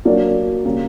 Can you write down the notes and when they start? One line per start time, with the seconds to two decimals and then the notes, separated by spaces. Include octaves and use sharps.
0.05 F#3 A#3 D4 A#4 D5
0.65 C#3 G3 A#3